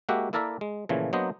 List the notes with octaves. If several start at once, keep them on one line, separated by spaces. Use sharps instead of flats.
G#3 A#3 F#4 G4 E5 F#5
A#3 E4 A4 A#4 D5 E5
G#3
A#2 C#3 E3 F3 A3
F#3 A#3 B3 D4 C5 D#5